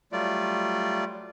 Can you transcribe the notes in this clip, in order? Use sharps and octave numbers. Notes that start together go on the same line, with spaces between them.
F#3 G3 A3 F4 D5